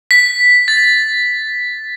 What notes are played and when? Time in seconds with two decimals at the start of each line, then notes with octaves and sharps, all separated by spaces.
0.11 B6
0.68 A6